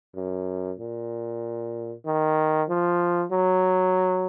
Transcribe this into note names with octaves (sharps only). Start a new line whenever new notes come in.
F#2
A#2
D#3
F3
F#3